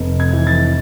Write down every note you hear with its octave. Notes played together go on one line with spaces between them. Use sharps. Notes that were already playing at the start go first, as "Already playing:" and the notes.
Already playing: F1
G#6
E3
A6